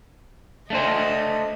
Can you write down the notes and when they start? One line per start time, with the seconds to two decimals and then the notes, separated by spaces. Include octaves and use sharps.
0.70 A3 D4 C5 D#5